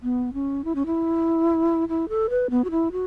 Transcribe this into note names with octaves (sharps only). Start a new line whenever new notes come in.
B3
C#4
E4
C#4
E4
E4
A4
B4
B3
F#4
E4
F#4